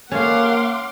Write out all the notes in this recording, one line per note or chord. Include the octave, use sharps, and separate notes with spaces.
A#3 C#4 C#5 F5 F#5 A5 C6 D6